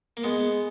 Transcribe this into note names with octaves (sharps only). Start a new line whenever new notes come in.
A#3
G#3 B3